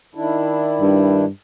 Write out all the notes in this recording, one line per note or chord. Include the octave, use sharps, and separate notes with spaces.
D#3 D4 E4
G2